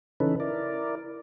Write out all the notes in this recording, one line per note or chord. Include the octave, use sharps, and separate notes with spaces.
C#3 E3 C#4 D#4 A4 B4
E4 A#4 D5